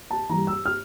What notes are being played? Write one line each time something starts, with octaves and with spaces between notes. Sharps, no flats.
A5
E3 G3 A#5
E6
F6